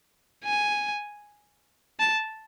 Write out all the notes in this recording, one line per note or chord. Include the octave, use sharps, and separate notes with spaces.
G#5
A5